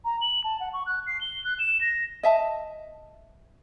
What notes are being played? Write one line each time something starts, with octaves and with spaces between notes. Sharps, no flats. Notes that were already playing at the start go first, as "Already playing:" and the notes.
A#5
F#7
A5
F#5
C#6
F#6
C7
G7
F#6
E7
A#6
D#5 E5 A5